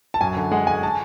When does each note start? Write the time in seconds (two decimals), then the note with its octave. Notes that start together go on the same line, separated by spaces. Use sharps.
0.14 A5
0.21 F#2 G#5
0.36 D3
0.51 G#3 F#5
0.67 G#3 G#5
0.83 A5